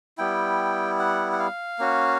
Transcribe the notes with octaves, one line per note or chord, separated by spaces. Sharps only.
G3 B3 E4 G5
F#5
F#5
F5
A#3 C#4 F#4